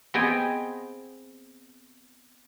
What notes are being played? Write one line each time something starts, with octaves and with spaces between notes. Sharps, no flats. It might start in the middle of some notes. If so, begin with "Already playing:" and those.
B3 C4 G#4 D#5 G5 G#5